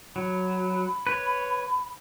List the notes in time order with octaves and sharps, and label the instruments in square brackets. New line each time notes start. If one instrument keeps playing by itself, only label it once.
[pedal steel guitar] F#3 [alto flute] B5
[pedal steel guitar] B4 C#5